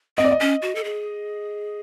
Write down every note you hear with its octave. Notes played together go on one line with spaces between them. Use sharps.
C4 D#5
D5
D#5
C#4
F#4
A4
G#4